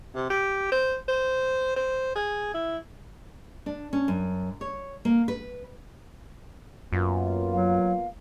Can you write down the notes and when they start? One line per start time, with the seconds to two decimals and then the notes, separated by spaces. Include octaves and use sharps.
0.15 C3
0.30 G4
0.72 C5
1.08 C5
1.76 C5
2.16 G#4
2.54 E4
3.66 D4
3.93 C#4
4.08 F#2
4.61 C#5
5.05 A#3
5.28 B4
6.93 F#2 A#3 B3 F4
7.53 F#3 F5